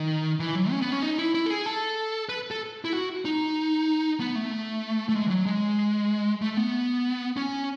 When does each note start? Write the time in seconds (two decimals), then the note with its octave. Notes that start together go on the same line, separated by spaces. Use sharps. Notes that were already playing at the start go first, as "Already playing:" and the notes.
Already playing: D#3
0.40 E3
0.55 F#3
0.71 C#4
0.81 B3
0.92 C#4
1.02 D#4
1.18 E4
1.34 E4
1.46 A4
1.50 G#4
1.66 A4
2.29 B4
2.51 A4
2.85 E4
2.93 F#4
3.25 D#4
4.20 B3
4.35 A3
5.09 A3
5.15 G#3
5.26 E3
5.30 F#3
5.46 G#3
6.42 A3
6.57 B3
7.37 C#4